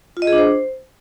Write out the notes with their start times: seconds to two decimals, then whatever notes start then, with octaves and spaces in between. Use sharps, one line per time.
0.17 F4
0.22 D#5
0.27 G#4
0.33 D4
0.38 C5